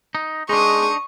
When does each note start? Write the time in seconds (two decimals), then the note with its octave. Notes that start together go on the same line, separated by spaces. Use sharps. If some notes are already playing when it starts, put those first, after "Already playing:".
0.15 D#4
0.49 G#3 D4 D#4 C#6 D#6